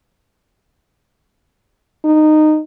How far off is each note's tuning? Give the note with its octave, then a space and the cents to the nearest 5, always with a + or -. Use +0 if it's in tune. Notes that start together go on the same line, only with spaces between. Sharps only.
D#4 -15